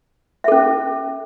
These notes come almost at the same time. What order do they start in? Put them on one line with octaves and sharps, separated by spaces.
E5 A4 C#4